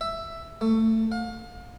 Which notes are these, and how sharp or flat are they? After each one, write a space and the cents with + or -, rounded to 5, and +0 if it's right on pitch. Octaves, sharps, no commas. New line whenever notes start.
E5 +5
A3 +20
F5 +35